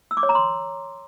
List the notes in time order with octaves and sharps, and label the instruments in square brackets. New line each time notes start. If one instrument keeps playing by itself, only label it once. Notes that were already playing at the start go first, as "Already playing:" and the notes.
[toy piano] E6
D6
C#5
A#5
C6